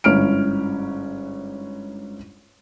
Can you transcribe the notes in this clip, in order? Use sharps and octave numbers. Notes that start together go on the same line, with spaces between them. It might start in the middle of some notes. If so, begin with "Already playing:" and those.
G1 G#2 C#4 E4 F6 D7